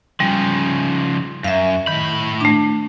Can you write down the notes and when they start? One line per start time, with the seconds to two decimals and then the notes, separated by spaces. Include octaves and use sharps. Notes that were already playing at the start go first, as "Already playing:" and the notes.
0.20 C#3 F3 G3
1.44 F#2 E5 F5
1.87 A2 D#3 B5
2.41 A3 D4